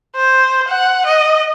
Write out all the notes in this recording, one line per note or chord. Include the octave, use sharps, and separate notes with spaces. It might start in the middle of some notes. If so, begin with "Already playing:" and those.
C5
F#5
D#5